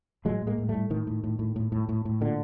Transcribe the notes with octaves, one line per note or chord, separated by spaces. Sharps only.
A2 F#3 G#3
A2
G#3 A#3
A2
A2 G3 A3
A2 D#3
A2
A2
A2
A2
A2
A2
A2
A#2 D3